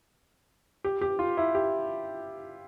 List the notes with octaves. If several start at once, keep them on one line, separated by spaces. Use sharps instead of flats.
G4
G4
F4
E4
G4